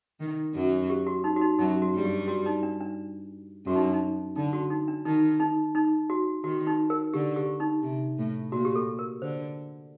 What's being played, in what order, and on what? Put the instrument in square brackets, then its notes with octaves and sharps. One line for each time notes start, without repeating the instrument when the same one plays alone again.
[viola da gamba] D#3
F#2 F#3
[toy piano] G4
F#4
D#4
F#4
D#4
[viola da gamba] F#2 F#3 [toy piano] D#4
[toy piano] F#4
[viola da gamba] G2 G3
[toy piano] G4
F#4
D#4
D4
D4
[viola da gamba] F#2 F#3 [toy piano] F#4
[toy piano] D#4
D4
D#4
[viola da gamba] D3 [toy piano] D#4
[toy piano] F#4
D#4
D4
[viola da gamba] D#3 [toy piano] D#4
[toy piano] D#4
D#4
F#4
[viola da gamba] D#3 [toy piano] F#4
[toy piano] D#4
A#4
[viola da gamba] D3 [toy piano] G4
[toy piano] G4
D#4
[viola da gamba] C3
A2
[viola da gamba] A#2 [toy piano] F#4
[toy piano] G4
A4
A#4
[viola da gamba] D3 [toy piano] C5